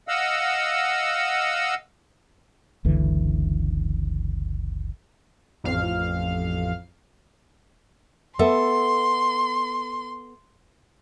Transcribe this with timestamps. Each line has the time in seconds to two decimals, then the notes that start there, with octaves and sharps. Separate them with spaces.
0.08 D#5 F5 F#5 E6
2.85 F#1 C#2 D3 E3
5.64 A1 F2 F5 F6
8.39 B3 A4 E5 C6